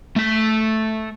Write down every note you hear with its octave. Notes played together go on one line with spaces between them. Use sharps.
A3 A5